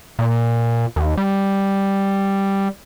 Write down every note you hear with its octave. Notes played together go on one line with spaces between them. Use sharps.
A#2
D#2
G3